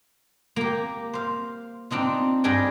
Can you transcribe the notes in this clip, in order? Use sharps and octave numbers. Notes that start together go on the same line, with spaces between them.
A#3 G4
C5 F5
C4 D4 D#4 F4
G2 G3 D4 G#4 D#5 G5